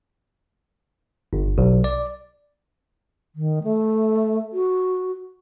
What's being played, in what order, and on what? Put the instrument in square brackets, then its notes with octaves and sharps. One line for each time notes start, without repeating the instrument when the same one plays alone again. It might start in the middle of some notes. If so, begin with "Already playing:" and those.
[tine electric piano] G1
B1
D5
[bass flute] D#3
A3
F#4